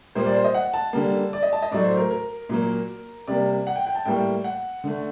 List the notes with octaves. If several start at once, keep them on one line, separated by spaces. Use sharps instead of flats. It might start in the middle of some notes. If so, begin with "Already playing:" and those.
A#2 G3 A#3 C5
D5
C5
D#5
F#5
A5
D3 G3 A#3
D5
D#5
A5
D#5
A2 F#3 A3 D5
C5
A#4
A#4
A#2 F#3 A#3
C3 G3 A#3 D5
F#5
G5
G5
A5
A2 G3 A#3 G5
F#5
D3 A3